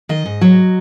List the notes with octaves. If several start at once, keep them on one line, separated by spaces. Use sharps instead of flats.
D#3 D#5
G#2
F#3